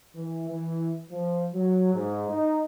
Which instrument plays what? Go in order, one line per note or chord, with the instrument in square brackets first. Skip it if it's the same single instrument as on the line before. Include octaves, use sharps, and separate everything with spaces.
[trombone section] E3
E3
F3
F#3
G#2
D#4